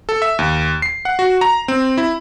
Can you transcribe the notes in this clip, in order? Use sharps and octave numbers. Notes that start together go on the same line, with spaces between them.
A4
E5
D#2
C7
F#5
F#4
A#5
C4
E4